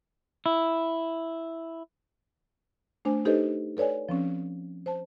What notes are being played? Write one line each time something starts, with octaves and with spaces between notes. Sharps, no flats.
E4
A3 D4 C5 G#5
D#4 G4 A4 B4 C5 D#5
A4 B4 C#5 D5 G#5
F3 C4 C#4
C5 A5